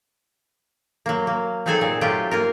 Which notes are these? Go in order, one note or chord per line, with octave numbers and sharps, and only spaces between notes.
F#3 A#3
A#3
F#3 C4 D#4 G#4 A4 G#5
A#2 G#4
F#3 A3 F4 G4 G5
A#3 F4 A#4